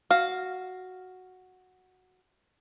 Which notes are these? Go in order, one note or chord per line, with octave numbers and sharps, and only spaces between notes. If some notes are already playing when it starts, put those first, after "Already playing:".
F#4 F5